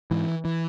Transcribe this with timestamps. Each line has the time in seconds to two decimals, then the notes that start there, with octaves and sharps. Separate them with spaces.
0.11 G#2 E3
0.45 E3